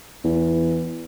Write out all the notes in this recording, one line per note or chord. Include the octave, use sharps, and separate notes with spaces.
E2